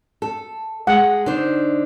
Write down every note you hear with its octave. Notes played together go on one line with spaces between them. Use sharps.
A4
G#3 F#5
D3 D#4 C5